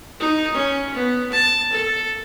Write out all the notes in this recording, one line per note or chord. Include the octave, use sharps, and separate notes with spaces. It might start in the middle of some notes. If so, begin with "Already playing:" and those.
D#4
C#4
B3
A5
A4